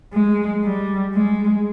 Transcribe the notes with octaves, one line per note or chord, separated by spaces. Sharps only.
G#3
G3
G#3